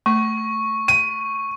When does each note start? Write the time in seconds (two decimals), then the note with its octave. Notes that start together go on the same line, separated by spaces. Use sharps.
0.06 A3 C#6
0.88 D#7